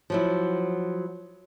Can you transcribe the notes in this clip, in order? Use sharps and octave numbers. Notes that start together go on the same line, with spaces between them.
F3 F#3 E4